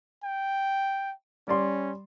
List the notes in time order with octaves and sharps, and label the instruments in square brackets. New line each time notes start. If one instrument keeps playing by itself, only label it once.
[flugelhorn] G5
[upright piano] G3 D5 C6 [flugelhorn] C#4